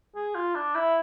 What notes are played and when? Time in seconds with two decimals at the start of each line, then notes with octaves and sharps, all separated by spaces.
0.15 G#4
0.35 F4
0.55 D4
0.75 E4